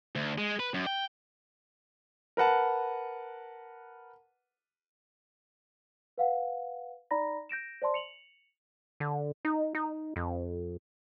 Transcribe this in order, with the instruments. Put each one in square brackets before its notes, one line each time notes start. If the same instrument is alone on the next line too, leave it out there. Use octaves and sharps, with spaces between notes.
[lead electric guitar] D2
G#3
B4
F#2
G5
[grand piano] A#4 B4 F#5 A5
[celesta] B4 F5 F#5
D#4 D5 A#5 B5 A#6
G6 A#6 D7 E7
C5 D5 A5 C6
C#7 F7 F#7
[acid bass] D3
D#4
D#4
F2